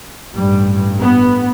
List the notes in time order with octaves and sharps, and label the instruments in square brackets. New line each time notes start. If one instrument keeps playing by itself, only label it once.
[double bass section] A1 G2 G3
B3